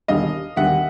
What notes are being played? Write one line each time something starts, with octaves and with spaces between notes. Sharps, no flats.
E1 D#2 D3 G3 D#5 F5
E1 D#2 D3 G3 E5 F#5